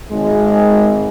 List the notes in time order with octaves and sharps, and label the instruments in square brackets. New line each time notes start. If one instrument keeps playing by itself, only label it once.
[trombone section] G#1 [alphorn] G#3